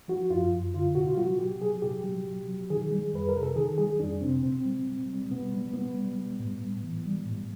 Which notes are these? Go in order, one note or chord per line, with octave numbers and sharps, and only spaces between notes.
F3 F#4
F#2 F4
F#2
D3 F4
B2 F#4
F4
F#3 F#4
B2 G4
F#3 G#4
B2 G4
F#3
B2
F#3
D#3 G#4
G3
F2 B4
A#4
C3
A4
D#3 G#4
G3 G#4
F2 D4
C3 C4
B2 C4
G3
B2
G3
B2 B3
G3
B2 B3
G3
G3
A2
A2
E3
G3
A2